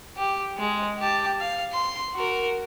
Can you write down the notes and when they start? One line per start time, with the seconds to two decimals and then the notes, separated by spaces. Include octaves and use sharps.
0.17 G4
0.58 G#3
0.98 G4 A5
1.40 F5
1.73 C6
2.15 F#4 A#4